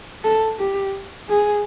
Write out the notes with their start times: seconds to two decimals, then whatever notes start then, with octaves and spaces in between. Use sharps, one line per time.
0.24 A4
0.59 G4
1.29 G#4